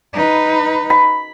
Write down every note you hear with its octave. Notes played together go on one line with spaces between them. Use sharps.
D#4 B4
B5